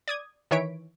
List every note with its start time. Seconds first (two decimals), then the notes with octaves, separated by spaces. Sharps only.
0.08 D5 D#6 G#6
0.51 D#3 E3 E4 C#5 B6 D7